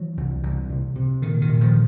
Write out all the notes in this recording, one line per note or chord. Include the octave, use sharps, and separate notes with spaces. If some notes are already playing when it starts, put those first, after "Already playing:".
Already playing: E3 F#3
C2
C2
C3
C3
A#2 D#3
D#3
A#2
D#3 F3